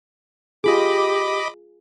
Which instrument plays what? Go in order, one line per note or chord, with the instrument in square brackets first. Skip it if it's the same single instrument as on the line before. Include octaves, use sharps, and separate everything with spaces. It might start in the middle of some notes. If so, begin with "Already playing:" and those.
[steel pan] F4 G#4 [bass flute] G4 [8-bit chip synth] D#5 B5 D6